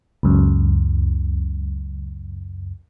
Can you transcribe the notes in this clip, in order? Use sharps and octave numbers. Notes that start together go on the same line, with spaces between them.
C#2 F#2